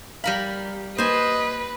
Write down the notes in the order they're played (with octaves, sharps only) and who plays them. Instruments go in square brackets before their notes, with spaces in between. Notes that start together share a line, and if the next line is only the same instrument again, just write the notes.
[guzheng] G3 A#4 B5 [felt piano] F5
[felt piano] A#3 [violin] B4 [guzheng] C5 G#5 [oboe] D#5